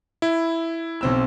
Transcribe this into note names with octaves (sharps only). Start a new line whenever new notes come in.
E4
B1 C4 E6